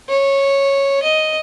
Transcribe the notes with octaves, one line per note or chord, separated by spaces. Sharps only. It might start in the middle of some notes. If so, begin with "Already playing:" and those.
C#5
D#5